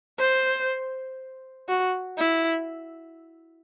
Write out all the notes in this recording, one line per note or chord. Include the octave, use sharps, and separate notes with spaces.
C5
F#4
E4